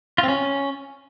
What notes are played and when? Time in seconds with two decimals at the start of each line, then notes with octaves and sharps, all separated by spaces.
0.18 F4
0.23 C4
0.28 C#4